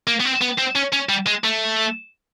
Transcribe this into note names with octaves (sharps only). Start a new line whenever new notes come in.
A#3
B3
C4
B3
C4
C#4
C#4
G3
G#3
A3